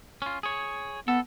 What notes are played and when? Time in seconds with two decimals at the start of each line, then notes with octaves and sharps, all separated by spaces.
0.22 C#4 F4
0.43 G#4 C#5
1.08 B3 A4